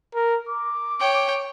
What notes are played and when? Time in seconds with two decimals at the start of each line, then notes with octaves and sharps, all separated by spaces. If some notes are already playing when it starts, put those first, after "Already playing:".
0.14 A#4
0.49 D6
1.00 C#5 G5